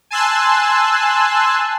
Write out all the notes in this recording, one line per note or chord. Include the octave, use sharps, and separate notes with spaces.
G#5 A5 C6 E6 F#6